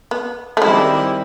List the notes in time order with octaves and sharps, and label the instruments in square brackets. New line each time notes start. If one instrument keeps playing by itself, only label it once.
[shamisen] B3
A3
[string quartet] D#3 G3 C4 E4 [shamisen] G#3